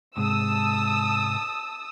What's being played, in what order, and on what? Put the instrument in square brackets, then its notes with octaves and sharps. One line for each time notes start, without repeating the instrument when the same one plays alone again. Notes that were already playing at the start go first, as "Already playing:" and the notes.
[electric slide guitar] G#2 C3 G#3 [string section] A5 D#6 E6